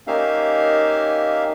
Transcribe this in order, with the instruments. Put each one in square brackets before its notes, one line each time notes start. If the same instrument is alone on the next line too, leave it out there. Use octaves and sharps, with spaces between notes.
[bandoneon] A#3 C#4 D#4 G4 E5 F5